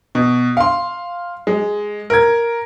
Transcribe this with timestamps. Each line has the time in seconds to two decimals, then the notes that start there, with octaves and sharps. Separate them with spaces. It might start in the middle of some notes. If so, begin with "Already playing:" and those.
0.15 B2
0.57 F5 C6
1.47 G#3
2.10 A#4 G#6